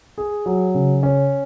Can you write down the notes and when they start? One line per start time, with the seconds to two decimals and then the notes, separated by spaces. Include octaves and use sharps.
0.18 G#4
0.46 F#3
0.74 C#3
1.03 C#4